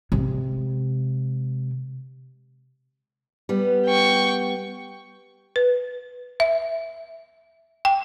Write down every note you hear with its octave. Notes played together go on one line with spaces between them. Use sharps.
C3 G#3
G3 B3
G5 C#6
B4
E5
G5